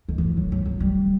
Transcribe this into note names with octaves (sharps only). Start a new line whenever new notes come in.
D#3
E3
F#3
F#3
F#3
G3